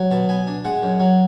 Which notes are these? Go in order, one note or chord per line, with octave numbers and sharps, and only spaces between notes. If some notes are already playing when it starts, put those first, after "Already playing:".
Already playing: F#3
B2 A5
B3 G#5
D4
G#3 F#5
F#2
F#3